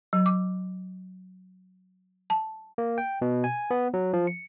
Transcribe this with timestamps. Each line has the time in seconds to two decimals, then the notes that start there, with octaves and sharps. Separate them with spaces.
0.13 F#3
0.26 D6
2.30 A5
2.78 A#3
2.98 G5
3.22 B2
3.44 G#5
3.71 B3
3.94 F#3
4.13 F3
4.27 C#7